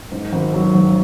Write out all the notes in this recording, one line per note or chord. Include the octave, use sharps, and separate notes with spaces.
G#2
G#1
F#3
G#1